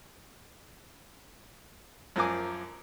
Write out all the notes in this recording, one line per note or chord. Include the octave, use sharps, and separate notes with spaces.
F#2 F3 A#4 G#5 D6